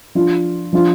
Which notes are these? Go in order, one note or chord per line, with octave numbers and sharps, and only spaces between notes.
F3 D4 F4
F3 D4 F4